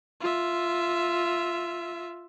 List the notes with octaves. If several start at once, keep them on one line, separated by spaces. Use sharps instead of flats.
F4 E5